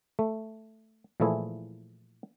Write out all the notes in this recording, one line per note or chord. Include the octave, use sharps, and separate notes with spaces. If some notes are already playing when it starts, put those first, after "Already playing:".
A3
A#2 E3 F3 A3 E4 G#4